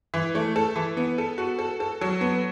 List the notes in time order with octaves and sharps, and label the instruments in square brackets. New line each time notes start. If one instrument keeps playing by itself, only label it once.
[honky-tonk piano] E3
A3
A4
E3
B3
A4
F#4
A4
A4
F#3
B3